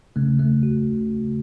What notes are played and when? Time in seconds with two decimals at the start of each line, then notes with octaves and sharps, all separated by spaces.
0.16 C#3 A3
0.39 A3
0.63 F#4